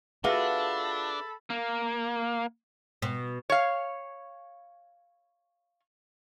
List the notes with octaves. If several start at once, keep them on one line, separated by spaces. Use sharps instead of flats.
D4 F4 F#4 G#4 A4 B4 E5 B5
A#3
B2
C#5 F5